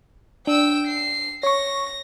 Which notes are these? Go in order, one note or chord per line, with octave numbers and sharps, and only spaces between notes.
D4 G5 E6
C7
C#5 C#6 A#6